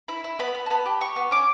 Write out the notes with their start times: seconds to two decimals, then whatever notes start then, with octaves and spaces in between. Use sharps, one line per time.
0.08 E4 B5
0.24 E4
0.39 B3 B5
0.55 B3
0.66 A5
0.70 B3 B5
0.86 G4
1.01 G4 C#6
1.16 B3
1.31 C#4 D6